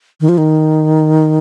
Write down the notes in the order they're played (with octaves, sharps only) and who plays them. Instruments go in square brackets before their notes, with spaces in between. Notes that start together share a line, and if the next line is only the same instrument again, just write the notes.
[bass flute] D#3
F3
D#3